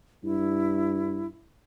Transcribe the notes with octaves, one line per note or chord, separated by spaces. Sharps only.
G2 E4